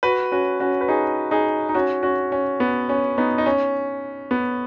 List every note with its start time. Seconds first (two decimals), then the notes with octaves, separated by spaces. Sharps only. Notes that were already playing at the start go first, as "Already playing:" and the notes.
0.03 F#4 B4
0.32 C#4 F#4
0.60 C#4 F#4
0.81 B4
0.88 D#4 G#4
1.31 D#4 G#4
1.69 D#4
1.74 C#4 F#4
2.03 C#4 F#4
2.32 C#4
2.60 B3
2.89 C#4
3.17 B3 D#4
3.38 D#4
3.46 C#4
4.31 B3